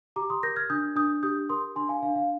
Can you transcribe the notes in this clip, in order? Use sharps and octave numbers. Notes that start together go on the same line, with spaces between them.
G4 A#5 D6
C6 D#6
A#4 G6 A#6
F6 G#6
D4 D#6 G6
D4 D#6 G6
G4 D#6 G6
A#4 C6 D#6
D4 G#5 C6
F5 G#5
D4 F5
F5